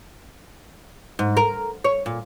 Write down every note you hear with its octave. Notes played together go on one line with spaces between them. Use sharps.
G#2
A#4
C#5
A#2